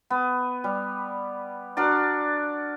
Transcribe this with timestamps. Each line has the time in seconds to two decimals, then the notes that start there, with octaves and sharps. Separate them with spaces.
0.10 B3
0.64 G3
1.77 D4 F#4 A#4 D5